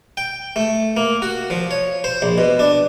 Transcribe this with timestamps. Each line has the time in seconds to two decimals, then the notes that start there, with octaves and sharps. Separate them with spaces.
0.17 G5
0.56 A3
0.97 A#3
1.22 F#4
1.50 F3
1.71 C#5
2.04 C5
2.22 A#1
2.38 B2
2.59 D4